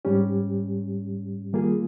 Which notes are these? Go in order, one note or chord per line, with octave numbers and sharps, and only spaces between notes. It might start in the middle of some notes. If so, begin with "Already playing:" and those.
G#2 G3 C#4 G4
D#3 G3 A#3 F4 G#4